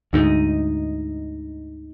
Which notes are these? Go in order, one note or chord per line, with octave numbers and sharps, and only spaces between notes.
D2 G#2 D#4 D#5